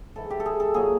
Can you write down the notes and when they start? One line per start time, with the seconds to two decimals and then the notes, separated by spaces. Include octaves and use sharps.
0.16 G#2 E3 A4
0.31 G4
0.40 A4
0.46 G#4
0.60 A4
0.74 A#2 F#3 G#4